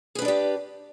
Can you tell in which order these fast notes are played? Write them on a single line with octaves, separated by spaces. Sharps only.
G#4 B4 D4 D5 G4